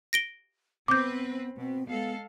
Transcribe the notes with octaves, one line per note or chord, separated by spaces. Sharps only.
A#6 D7 G7
B3 C4 B4 D6 G6
B2 C4
G#3 B3 A4 F5